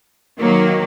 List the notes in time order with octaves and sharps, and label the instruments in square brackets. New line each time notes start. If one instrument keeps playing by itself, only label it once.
[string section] D#3 F#3 A#3